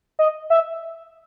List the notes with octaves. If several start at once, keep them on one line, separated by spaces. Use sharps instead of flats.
D#5
E5